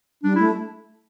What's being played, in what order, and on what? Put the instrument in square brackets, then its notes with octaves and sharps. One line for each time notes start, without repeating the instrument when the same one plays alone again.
[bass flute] G3 [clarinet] D4
[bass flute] A3 [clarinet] E4